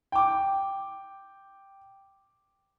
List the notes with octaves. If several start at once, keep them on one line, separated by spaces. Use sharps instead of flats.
G5 D6